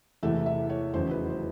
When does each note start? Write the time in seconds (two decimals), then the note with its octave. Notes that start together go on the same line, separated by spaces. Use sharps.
0.23 E2 C3 E3 A3 E5
0.46 E5
0.70 C#5
0.94 F1 E2 C#3 F#3 C5
1.11 B4
1.30 C5